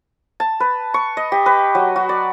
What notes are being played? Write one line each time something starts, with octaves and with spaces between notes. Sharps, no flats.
A5
B4
C#6
D#5
G4
B4
F#3
F#4
D5